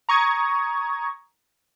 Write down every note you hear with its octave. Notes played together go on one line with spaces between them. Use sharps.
A#5 C#6 D#6 G#6